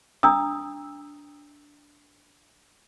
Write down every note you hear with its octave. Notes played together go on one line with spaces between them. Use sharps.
D4 A#5 D#6 E6